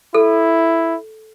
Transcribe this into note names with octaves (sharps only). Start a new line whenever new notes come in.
E4 A4